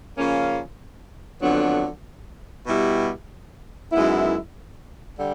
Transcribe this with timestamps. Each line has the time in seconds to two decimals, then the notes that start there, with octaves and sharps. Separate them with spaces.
0.18 C#3 F3 A#3 C#4 F4
1.42 F2 D3 F#3 B3 D4
2.67 B2 G3 B3 E4 G4
3.92 F#2 D#3 G#3 B3 E4
5.18 D3 G3